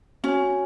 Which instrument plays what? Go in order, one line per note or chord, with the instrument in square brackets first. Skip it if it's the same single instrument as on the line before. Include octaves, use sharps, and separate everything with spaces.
[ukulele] C#4 [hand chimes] F#4 C#5 G#5